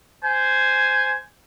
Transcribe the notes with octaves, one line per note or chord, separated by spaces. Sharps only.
C5 G#5